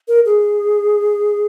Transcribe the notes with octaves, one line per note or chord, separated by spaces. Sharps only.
A#4
G#4